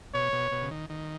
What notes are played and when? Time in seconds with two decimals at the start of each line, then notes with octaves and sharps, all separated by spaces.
0.14 B2 C#5
0.33 B2
0.52 B2
0.62 C#3
0.71 D#3
0.90 D#3